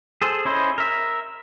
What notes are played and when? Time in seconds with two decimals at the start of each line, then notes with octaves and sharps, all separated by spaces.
0.22 G#4 A4 C5
0.45 C#4 E4 C5 D#5
0.78 A#4 E5